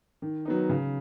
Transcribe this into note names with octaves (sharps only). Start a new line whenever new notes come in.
D#3
F#3 B3 D#4
C#3